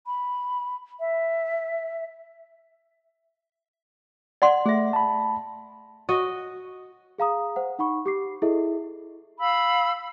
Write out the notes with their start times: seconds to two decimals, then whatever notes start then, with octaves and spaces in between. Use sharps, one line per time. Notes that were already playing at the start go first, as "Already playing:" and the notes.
0.07 B5
1.00 E5
4.42 D5 F#5 C6
4.66 A3 G#4 E5
4.93 A5 B5
6.09 F#4 D#5
7.18 G#4 F5 A#5 D#6
7.56 C5 F#5
7.79 D#4 F#5 B5 C#6
8.06 G4 D6 C7
8.42 E4 G#4 A4 D#5 E5
9.40 F5 B5 E6